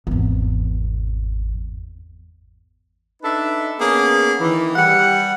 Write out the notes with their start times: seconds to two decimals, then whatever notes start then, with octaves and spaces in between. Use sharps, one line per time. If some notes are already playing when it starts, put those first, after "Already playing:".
0.07 G#1 E2
3.23 D4 D#4 A4 B4 E5
3.79 A#3 B3 C#4 G#4
4.41 D#3 E3
4.76 G3 G4 F#5